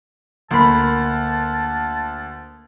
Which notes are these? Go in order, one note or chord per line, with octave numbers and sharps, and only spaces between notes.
D2 A#3 A#4 A5 B5 C6